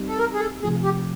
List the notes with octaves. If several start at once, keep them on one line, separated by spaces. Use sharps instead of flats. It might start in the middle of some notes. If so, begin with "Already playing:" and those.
Already playing: G3 C4 D#4 G4
A4
A#4
G#4
A4
C3 F3 A3 G#4
G4